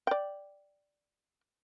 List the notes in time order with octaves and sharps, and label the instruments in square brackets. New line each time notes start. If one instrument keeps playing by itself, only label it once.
[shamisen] D5 G5